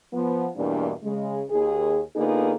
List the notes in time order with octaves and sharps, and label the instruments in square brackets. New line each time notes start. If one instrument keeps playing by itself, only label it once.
[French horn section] F3 B3
E2 G2 B2 E3 A#3 D4
C#3 G#3
D#2 G#4
D3 A#3 B3 D#4 F4 G#4